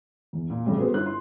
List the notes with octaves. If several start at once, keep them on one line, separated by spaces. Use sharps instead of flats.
E2
A#2
A1 F2 A2 C#3 G3 A3
B3 F#4 G#4 A4 B4 C5
G1 E4 F4 F#6
C6